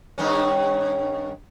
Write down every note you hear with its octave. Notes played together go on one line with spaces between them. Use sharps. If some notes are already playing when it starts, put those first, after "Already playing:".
G2 D#3 C#4